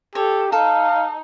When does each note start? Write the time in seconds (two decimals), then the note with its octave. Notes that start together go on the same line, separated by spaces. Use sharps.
0.15 G4 A4 C#5
0.52 D#4 A4 F5